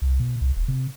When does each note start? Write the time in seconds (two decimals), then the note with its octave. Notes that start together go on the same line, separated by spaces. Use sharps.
0.02 C2
0.20 B2
0.41 C2
0.57 D#1
0.68 C3